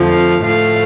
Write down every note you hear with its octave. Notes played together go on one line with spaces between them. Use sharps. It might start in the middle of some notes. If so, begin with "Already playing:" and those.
Already playing: F2 D3 F3 A3
F5
A2 F3 A3 F5